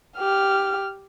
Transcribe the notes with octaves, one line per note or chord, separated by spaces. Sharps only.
G4 F6